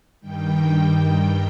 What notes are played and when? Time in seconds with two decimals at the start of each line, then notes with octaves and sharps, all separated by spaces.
0.21 G2 D#3 G3 G5